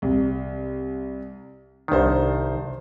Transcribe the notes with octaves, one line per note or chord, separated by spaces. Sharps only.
C2
C2 D#3 D4 C5